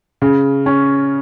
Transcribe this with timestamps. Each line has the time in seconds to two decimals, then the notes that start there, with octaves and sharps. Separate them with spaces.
0.22 C#3
0.66 C#4